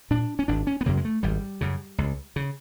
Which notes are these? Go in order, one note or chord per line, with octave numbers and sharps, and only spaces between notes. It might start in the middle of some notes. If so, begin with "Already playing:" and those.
A#2 D4
C#4
G#1 D4
C#4
B3
F#2 C#3 A#3
G#3
A3
G#1 G3
F#2 C#3
C#2
C#3